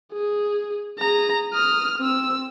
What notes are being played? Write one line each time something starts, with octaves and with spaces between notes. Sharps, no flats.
G#4
G#4 A#5
D#6 F6
C4 E6